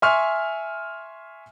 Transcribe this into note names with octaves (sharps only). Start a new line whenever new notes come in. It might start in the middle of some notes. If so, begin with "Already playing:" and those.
E5 G#5 C6 C#6 F6